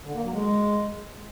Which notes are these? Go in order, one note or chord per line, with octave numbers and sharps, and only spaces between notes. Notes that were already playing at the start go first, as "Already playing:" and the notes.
D3
A#3
F#3
G#3